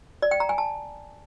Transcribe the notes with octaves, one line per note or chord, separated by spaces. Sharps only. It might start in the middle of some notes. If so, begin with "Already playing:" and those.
D5
G5
A#5
G#5
A5